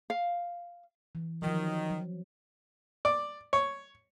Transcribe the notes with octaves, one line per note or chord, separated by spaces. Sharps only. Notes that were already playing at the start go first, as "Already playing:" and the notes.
F5
E3
D#3 F3 F#3
F#3
D5
C#5